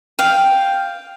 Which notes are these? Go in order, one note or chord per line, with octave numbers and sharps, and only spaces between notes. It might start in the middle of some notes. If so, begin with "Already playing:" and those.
F5 G5